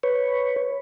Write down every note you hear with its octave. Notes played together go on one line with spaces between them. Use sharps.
B4 C#5